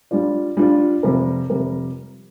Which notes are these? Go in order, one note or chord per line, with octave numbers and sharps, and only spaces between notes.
G3 D4 F4 D5
G3 D4 F4 D5
F2 C3 G3 C4 A#4
F2 C3 G3 C4 A#4